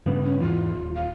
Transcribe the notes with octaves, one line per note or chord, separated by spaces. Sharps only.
G2 C#3 B3
C#4
E2 G#2 E3 F4
D#1
F5